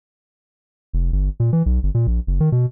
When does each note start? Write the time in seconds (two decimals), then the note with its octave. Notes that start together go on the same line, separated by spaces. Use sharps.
0.93 F1
1.12 G1
1.40 A#2
1.53 E3
1.66 B1
1.83 G1
1.95 A#2
2.07 A#1
2.27 F#1
2.40 D#3
2.52 B2